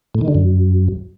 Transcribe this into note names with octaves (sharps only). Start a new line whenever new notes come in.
A2
D#3
D3
F#2